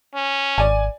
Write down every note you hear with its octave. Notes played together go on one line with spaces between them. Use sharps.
C#4
G#1 D5 G#5